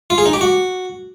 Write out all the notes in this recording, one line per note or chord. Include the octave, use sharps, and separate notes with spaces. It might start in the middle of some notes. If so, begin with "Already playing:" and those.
F4
G#4
D#4
G4
F#4